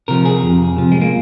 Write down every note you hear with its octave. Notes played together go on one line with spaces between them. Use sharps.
C3 F3 A#4
G#4
F2
C3 F3
G#3
A#3